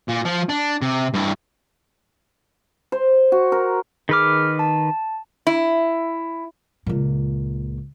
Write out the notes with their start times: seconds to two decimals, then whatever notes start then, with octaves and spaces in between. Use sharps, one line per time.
0.08 A#2
0.25 F3
0.49 D4
0.82 C3
1.14 G2 E4
2.92 C5
3.32 F#4
3.52 A#4
4.09 D#3 G#4 B4 D6 F6
4.59 A5
5.47 E4
6.86 C#2 A#2